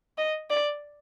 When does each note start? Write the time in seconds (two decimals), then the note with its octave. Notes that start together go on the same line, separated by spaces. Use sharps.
0.18 D#5
0.50 D5